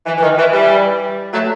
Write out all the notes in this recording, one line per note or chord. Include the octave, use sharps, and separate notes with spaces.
E3
E3
D#3
E3
E3 G3
F#3 A3